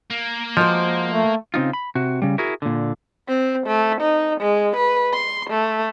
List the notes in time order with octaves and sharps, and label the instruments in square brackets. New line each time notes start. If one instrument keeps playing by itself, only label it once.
[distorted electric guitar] A#3
[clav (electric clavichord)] F3 [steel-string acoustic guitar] G#3 F#4 C5
[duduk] A3
[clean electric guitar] C#3 C4 D#4 F4
B5
C3 F#4
C#3 G3
E4 F#4 G#4 A#4
A#2 D3
[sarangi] C4
A3
D#4
G#3
B4
C6
A3